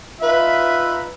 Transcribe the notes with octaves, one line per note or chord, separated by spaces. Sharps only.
D#4 F4 B4 E5